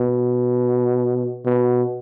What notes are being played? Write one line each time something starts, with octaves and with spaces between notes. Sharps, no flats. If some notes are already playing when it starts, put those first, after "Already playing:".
Already playing: B2
B2